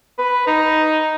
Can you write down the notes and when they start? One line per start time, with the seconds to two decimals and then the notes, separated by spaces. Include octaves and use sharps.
0.19 B4
0.47 D#4